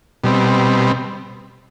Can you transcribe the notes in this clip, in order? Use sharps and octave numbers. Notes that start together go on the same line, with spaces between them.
B2 G3 C4